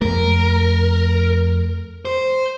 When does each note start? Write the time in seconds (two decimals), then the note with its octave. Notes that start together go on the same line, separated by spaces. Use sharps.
0.02 F2 A3 A#4
2.05 C5